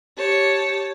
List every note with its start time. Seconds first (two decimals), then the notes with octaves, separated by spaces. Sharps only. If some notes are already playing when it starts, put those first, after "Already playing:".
0.17 G4 C#5 A5